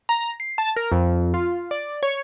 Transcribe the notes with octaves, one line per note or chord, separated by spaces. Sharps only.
A#5
C7
A5
A#4
F2
F4
D5
C#5